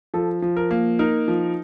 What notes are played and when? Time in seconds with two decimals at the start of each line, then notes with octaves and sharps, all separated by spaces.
0.14 F3 A4
0.42 F3
0.57 A#4
0.71 A#3
0.99 D#4 A#4
1.28 F3